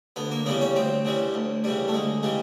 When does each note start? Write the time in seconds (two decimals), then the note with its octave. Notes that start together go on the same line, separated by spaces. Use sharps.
0.16 D2 B3
0.31 A#3
0.46 C#3 E3 G3 B3
0.61 C#4
0.76 D2 C4
1.05 C#3 E3 G3
1.34 D2
1.64 C#3 E3 G3
1.88 A3
1.94 D2 G#3
2.23 C#3 E3 G3